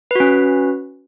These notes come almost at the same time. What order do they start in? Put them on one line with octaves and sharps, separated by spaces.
B4 F#4 C#4